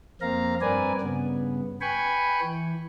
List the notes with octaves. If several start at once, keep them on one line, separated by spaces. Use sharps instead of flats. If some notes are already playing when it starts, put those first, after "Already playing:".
F2 A#3 C4 F5 A#5
G2 C4 A#4 B4 D5 G#5
G2 C#3 B3
B4 G5 G#5 B5 C#6
E3